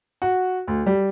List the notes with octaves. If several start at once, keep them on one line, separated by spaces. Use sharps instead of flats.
F#4
D2
G3